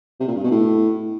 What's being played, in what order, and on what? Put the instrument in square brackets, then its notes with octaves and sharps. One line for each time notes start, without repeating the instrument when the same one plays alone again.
[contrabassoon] C3
A#2
G2
B2
A2